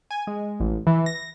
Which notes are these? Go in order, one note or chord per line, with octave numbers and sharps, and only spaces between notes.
G#5
G#3
A1
E3
A#6